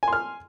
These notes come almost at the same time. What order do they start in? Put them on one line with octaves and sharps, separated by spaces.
G#5 C6 F6